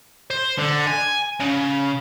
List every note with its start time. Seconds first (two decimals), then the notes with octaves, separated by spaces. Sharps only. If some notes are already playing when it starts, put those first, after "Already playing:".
0.30 C5
0.58 D3
0.87 G#5
1.40 C#3